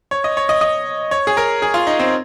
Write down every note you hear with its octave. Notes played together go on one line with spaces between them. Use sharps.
C#5
D#5
C#5
D#5
D#5
C#5
G#4
A#4
G#4
F4
D#4
C4